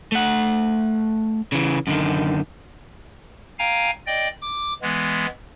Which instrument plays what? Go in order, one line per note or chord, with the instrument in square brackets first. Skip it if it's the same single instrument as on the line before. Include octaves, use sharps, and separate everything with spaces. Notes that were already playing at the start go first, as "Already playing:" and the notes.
[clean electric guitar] A3 F#5
C#3 E3
F#2 D3 D#3
[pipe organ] F5 G5 G#5 A#5
D5 D#5 G5
D6
E3 G#3 B3